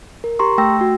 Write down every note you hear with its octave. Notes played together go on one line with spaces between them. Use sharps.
A#4
G4 A#5 C6 C#6
A3 G5 E6 A#6
F#4